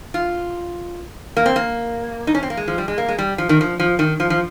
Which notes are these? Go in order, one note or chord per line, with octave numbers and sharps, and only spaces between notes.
F4
A#3
C4
A#3
D#4
C#4
C4
A#3
G#3
F3
G3
G#3
A#3
G#3
G3
F3
D#3
F3
F3
D#3
F3
F3